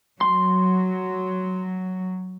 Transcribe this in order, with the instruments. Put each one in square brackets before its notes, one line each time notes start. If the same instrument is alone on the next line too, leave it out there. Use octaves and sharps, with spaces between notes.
[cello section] F#3 [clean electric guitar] C6